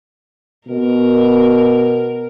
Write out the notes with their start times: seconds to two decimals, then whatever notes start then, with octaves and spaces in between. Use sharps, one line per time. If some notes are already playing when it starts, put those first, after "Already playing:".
0.68 B2 A#4